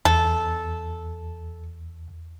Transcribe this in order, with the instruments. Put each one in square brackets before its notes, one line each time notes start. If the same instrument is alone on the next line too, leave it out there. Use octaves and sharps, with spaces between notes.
[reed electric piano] E2 [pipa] A4